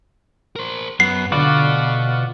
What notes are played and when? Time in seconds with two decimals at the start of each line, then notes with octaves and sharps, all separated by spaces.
0.56 A#4 C5
1.00 F#2 B3 C7
1.32 B2 D3 F4 F#4 D5 B5